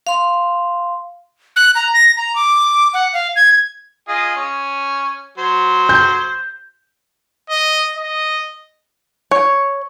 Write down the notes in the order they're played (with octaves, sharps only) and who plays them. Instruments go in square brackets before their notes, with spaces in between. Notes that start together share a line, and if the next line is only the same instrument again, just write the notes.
[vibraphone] F5 C6
[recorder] F#6
A#5
A#6
A#5
D6
F#5
F5
G#6
[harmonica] F4 G#4 D#5
C#4
F#3 C5
[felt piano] G6
[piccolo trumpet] D#5
D#5
[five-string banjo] C#5